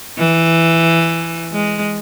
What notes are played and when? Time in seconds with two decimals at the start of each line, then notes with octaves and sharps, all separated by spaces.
0.18 E3
1.52 G#3